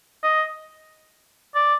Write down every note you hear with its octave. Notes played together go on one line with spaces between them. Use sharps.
D#5
D5